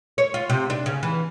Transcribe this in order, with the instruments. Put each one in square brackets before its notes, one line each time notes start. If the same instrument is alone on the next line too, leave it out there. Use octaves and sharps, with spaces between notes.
[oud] C#5
F4
C3
D4
C#3
E3